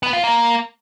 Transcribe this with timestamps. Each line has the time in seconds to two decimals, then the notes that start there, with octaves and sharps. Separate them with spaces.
0.03 B3
0.13 F4
0.24 A#3